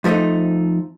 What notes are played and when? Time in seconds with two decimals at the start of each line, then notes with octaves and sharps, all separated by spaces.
0.04 F2 F3 G#3 A3 D#4